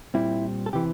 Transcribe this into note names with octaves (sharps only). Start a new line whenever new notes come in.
A#2 G3 C4 E4
A4
C3 E3 G4